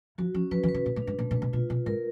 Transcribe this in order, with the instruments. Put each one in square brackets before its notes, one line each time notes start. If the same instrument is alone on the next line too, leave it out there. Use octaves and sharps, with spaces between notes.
[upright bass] F3 [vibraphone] F#4
[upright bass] F3 [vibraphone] C#4
[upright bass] F3 [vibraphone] B4
[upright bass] E3
[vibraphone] B4
[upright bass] C#3
[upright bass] A#2 [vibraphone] B4
[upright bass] A2
[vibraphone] D4
[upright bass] G#2
[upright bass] A#2 [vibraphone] A3
[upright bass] A#2
[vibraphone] B4
[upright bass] B2
[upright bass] B2 [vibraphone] F4
[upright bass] B2 [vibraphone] F4
[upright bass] G#2 [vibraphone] A#4